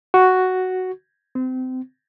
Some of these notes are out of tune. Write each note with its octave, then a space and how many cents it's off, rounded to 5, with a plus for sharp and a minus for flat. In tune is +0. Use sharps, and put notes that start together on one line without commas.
F#4 +5
C4 -30